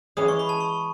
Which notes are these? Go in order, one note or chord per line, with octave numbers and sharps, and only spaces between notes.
E3 G#3 C#4 G#4 D#6
C#6
B5
A5
C#6